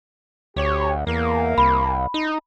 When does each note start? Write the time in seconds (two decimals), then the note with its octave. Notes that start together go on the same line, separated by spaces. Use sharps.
0.56 D2 G4 C#5
1.07 E2 A#3
1.58 C2 B5
2.14 D#4